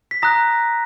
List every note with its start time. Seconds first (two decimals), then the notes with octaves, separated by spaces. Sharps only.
0.11 B6
0.22 A#5 D#6 F#6 A#6